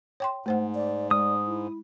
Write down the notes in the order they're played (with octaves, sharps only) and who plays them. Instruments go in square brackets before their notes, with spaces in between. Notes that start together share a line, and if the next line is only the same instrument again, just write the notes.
[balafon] C#5 G5 C6
[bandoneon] G#2 [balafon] A3 C5 F#5
[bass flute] D5
[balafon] G#3 [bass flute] D5 [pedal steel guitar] D#6
[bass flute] E4